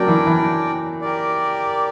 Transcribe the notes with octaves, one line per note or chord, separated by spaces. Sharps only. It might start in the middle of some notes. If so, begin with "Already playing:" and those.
Already playing: F#3 A#3 C#4 D4 A#4 D5 G5
E3
E3
G4 A#4 D5